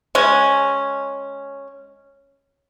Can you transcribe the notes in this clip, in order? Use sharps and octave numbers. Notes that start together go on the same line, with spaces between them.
G#3 C#4